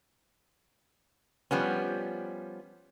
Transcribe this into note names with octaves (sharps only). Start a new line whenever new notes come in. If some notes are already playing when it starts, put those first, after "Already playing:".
F3 G3 B3 C#4